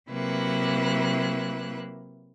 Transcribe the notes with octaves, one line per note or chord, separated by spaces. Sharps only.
C3 F#3 A#3 E4 B4 F#6